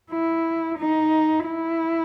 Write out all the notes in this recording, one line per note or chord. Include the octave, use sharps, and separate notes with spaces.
E4
D#4
E4